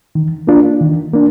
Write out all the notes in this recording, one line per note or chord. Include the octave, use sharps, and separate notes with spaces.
D#3
A#3 D4 F4
D#3
A#3 D4